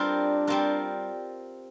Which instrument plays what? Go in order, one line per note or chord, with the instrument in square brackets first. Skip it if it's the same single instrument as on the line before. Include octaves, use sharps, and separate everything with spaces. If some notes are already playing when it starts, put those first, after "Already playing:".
Already playing: [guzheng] G3 C4 F4 A#4 [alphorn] D4
[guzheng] G3 C4 F4 A#4